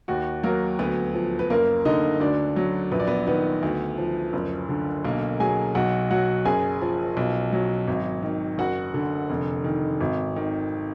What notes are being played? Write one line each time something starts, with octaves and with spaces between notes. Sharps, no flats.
D#2 F#4
F#3 A#3 A#4
D2 B3 B4
F3
B4
F#1 A#3 A#4
D3 D#4 D#5
D2 D4 D5
F#3
A#1 B4
D5
B3 B4
D#3 B3 B4
D2
F3
F#1
D3
B1 A#3 A#4
F#3 G#4 G#5
B1 F#4 F#5
F#3 F#4 F#5
F#1 G#4 G#5
F3
B1
F#3
G#1
D#3
F#1 F#4 F#5
D3
F1
D#3
G#1
D#3